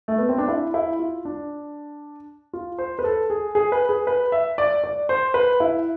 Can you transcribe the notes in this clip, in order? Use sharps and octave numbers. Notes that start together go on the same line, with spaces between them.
A3
B3
C4
D4
E4
E4
F4
D4
F4
C5
B4
A4
G#4
G#4
B4
G#4
B4
E5
D5
D5
C5
B4
E4